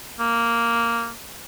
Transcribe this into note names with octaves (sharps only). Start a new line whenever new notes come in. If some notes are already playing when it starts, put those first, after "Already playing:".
A#3